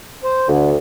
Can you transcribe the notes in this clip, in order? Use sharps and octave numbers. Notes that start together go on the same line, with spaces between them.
C5
D2 D3